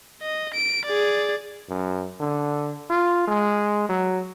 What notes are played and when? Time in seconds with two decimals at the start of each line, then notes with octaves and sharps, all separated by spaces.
0.22 D#5
0.54 D7
0.86 G#4 D5
1.69 F#2
2.20 D3
2.90 F4
3.28 G#3
3.89 F#3